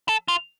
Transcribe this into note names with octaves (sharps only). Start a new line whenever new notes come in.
A4
F4